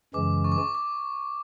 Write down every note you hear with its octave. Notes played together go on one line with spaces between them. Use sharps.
F#2 C#3 E3 G#3 C#4 D6
C#6
D6
C#6
D6